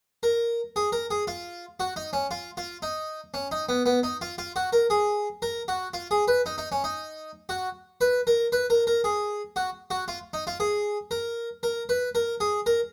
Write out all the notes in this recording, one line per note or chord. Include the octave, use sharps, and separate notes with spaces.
A#4
G#4
A#4
G#4
F4
F#4
D#4
C#4
F4
F4
D#4
C#4
D#4
B3
B3
D#4
F4
F4
F#4
A#4
G#4
A#4
F#4
F4
G#4
B4
D#4
D#4
C#4
D#4
F#4
B4
A#4
B4
A#4
A#4
G#4
F#4
F#4
F4
D#4
F4
G#4
A#4
A#4
B4
A#4
G#4
A#4